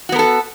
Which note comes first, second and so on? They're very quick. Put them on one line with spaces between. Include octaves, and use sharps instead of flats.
F#4 B3 A#4 A4